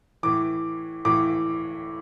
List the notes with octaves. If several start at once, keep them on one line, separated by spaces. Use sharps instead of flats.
A2 E3 D6
A2 E3 D6